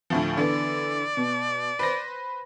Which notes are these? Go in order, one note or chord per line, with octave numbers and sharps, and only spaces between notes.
D2 A2 F3
D3 E3 B3 D5
B2
B4 C5 A#6